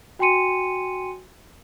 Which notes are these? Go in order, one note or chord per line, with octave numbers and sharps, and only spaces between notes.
F#4 G5 G#5 C6 C#7 D#7